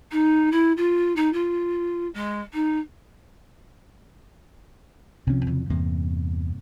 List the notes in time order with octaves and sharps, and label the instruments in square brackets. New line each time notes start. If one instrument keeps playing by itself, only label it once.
[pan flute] D#4
E4
F4
D#4
F4
G#3
D#4
[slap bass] C2 C#4 [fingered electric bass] C3 F3
[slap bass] E2 C#3 E3
[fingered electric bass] E2 [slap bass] G2 C3 A#3